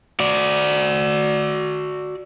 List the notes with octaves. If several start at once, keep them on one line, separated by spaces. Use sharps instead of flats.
F#4 D5